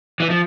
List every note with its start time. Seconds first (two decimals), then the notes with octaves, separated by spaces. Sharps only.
0.20 E3
0.30 F3